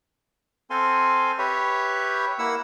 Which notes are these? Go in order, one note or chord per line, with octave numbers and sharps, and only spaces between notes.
C4 A4 F5 G#5 C6
G4 B4 C#5 E5
A#3 E4 F#5 E6